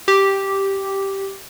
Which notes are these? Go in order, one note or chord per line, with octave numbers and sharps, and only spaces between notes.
G4